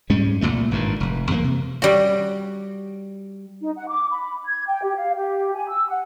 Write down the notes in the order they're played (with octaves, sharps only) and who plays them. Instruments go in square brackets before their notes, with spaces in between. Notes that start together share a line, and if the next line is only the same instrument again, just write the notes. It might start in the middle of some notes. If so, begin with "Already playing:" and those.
[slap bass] G#2 G3 G#3 C#4
C2 F2 A#2 A3
G#1 G2 A#2
F1
E2 A3 A#3
C3
[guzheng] G3 F#4
[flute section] D#4
F#5
D6
B5
G#6
G5
G4
F5
G4
G#5
E6
F#5